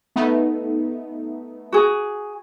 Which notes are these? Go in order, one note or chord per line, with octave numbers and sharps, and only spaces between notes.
A3 B3 D#4
F#4 G#4